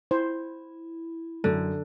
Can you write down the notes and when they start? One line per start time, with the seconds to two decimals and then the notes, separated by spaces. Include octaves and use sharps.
0.11 E4 C5
1.44 F#2 D3